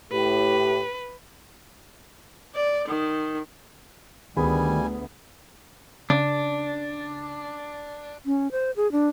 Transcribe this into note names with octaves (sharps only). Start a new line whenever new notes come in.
A2 G4 B4
D5
D#3
D2 D#3 G3 B3 G#4 G#5 B5
C#3 D4
C#4
C5
G#4
D4